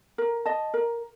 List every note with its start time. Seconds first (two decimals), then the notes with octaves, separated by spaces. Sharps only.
0.18 A#4
0.46 D#5 A5
0.74 A#4